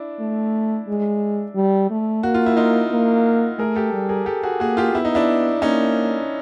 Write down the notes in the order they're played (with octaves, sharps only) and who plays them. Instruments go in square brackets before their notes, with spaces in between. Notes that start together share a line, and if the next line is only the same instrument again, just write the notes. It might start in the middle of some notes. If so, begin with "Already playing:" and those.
Already playing: [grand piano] D4 E4
[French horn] A3
G#3
G3
A3
[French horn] A#3 [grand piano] F#4
[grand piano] F4
E4
D#4 F4
[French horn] A#3
[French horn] A3 [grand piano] G#4 A#4
[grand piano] G4 A4
[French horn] G3
[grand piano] G#4 A#4
G4 A4
F#4 G#4
[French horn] A#3 [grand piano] F#4 G#4
[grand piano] F4 G4
[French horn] B3 [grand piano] E4
[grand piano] D#4
D4 E4
[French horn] A#3 [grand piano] C#4 D#4